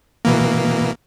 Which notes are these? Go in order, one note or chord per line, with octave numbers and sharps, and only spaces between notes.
B2 E3 A#3